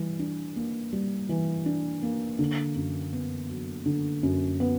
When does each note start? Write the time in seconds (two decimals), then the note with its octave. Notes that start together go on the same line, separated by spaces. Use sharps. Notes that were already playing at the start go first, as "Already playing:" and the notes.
Already playing: E3 G3
0.19 D4
0.56 A#3
0.93 G3
1.29 E3
1.66 D4
2.03 A#3
2.39 D3
2.76 F#2
3.13 B3
3.49 F#3
3.86 D3
4.23 F#2
4.60 B3